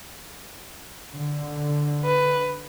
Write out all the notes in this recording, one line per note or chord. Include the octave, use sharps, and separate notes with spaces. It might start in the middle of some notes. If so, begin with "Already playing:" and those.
D3
B4